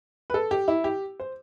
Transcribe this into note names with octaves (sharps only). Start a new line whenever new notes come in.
B4
A4
G4
E4
G4
C5